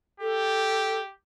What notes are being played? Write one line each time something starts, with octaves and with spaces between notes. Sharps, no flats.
G4 A4